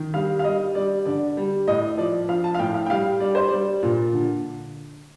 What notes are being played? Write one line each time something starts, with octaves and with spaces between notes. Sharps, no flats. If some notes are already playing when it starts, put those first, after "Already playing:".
Already playing: D#3
G3 F5
F5
G3 D#5
G3 D5
D3 D5
G3
A2 D#5
F3 D5
F3 F5
A5
F5
A2 G5
F5
G5
G3 F5
G3 D5
C5
G3 D5
A#2
D3